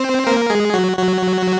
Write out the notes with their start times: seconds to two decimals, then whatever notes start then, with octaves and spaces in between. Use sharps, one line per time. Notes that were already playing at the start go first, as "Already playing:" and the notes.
Already playing: C4 C5
0.27 A#3 A#4
0.50 G#3 G#4
0.74 F#3 F#4
0.98 F#3 F#4